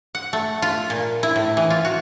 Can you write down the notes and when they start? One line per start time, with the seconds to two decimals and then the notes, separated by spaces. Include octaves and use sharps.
0.15 F#5
0.33 A3
0.62 F4
0.90 A#2
1.23 E4
1.36 A2
1.57 E3
1.70 F4
1.85 F#4